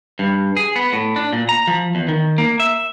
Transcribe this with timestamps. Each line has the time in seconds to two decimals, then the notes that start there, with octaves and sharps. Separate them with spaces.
0.19 G2
0.57 G#4
0.76 B3
0.93 A2
1.16 D4
1.33 A#2
1.49 A#5
1.67 F3
1.95 E2
2.08 D#3
2.38 A#3
2.60 E5